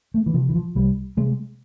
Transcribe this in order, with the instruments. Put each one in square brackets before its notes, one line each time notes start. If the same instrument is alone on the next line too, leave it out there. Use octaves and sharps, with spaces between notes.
[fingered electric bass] A3
E3
C3 F3
E3
F3
C2 G3
C3 G#3